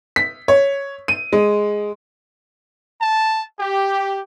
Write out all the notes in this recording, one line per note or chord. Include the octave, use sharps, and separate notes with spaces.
B6
C#5
D#7
G#3
A5
G4